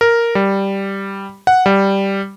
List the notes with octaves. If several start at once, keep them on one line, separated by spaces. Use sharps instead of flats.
A#4
G3
F#5
G3